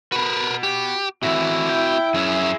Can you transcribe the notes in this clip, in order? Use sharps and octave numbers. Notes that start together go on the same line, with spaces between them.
F#4 A#4 B4 B5
G4
A2 E3 C4 E4 F#4
G5
F#2 C#4 G#4 E5